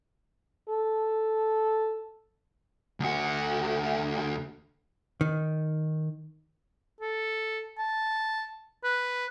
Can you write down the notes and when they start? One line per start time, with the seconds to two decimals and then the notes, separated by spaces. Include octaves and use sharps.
0.69 A4
3.00 D2 F#4
5.21 D#3
7.01 A4
7.78 A5
8.84 B4